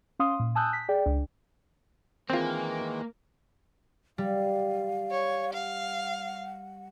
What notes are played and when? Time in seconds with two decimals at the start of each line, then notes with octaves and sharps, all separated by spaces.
0.19 C#4 F5 C6 D#6
0.40 A#2
0.55 G#5 A5 D#6 E6 F#6 G6
0.73 B6
0.89 G#4 D5 G5
1.06 C#2 D4
2.30 D#3 E3 G#3 A#3 C4 F4
4.18 G3 F5
5.11 C#5
5.53 F5 F#5